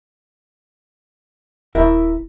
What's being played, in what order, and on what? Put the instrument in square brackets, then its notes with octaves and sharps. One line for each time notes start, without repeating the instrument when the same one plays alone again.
[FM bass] D#1 [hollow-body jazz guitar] E4 A#4 E5